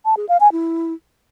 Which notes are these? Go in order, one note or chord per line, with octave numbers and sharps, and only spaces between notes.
A5
G#4
F5
G#5
E4